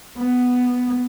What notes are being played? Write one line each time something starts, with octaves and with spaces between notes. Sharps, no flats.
B3